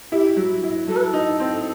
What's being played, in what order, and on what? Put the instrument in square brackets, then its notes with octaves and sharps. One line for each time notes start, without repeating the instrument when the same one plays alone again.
[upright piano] E4 [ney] G4
[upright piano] F#3
E4
[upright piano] F#3 [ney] A4
[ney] B4
A4
[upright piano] D#4
C4